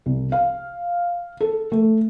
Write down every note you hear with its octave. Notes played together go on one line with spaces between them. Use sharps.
C2
F5
A4
A3